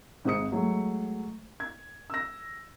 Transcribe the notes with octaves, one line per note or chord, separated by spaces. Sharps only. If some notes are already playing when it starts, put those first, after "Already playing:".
G#1 G#2 C4 D#6 C#7
F#3 G#3 A3
G#6
E6 A#6